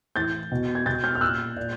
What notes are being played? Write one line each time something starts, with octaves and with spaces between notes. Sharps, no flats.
A2 E3 G6 A6
B2
G#6
B2 G6 A6
F6 G6
F6
A#2 E6 F#6
A#2